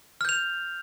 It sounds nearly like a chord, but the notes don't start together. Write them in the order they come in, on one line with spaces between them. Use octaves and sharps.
F6 G6 F7